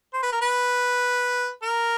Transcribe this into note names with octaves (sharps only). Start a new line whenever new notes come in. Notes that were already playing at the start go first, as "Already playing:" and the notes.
C5
B4
A#4
B4
A#4